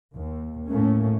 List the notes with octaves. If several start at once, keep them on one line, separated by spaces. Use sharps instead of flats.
D#2
A2 A3 A#3 C#4